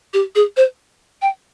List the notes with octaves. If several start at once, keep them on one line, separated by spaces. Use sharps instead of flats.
G4
G#4
C5
G5